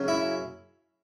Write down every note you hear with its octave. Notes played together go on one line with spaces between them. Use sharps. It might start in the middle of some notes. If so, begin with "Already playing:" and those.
Already playing: F#2 C#3 F#3
E4